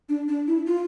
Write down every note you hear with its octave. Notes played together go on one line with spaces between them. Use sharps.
D4
D4
E4
F4